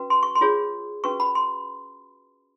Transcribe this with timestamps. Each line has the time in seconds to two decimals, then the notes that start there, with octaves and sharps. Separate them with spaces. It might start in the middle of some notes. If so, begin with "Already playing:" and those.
Already playing: C#4 F#4 B4
0.10 C6
0.23 C#6
0.35 C6
0.41 F4 G#4 C#5
1.04 C#4 F#4 B4 C#6
1.20 B5
1.35 C6